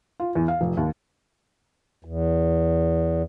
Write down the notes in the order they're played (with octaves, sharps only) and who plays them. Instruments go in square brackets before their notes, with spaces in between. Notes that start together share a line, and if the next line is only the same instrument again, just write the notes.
[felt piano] F4
E2
F5
F1
D#2
[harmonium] E2